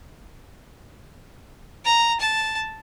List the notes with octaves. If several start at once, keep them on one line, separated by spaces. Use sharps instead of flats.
A#5
A5